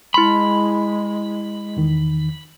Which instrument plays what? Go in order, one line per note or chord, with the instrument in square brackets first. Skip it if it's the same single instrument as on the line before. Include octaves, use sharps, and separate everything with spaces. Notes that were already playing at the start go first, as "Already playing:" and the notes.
[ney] G#3 [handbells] E4 C6 [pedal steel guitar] B5
[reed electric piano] E2 D#3